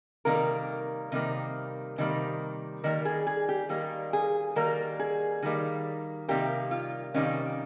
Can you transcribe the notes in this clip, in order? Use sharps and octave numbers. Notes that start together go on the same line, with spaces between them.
C3 D#3 G3 A#3 A#4
C3 D#3 G3 A#3
C3 D#3 G3 A#3
D#3 G3 A#3 A#4
G#4
G#4
G4
D#3 G3 A#3
G#4
D#3 G3 A#3 A#4
G#4
D#3 G3 A#3
C3 D#3 G3 A#3 G4
F4
C3 D#3 G3 A#3 C#4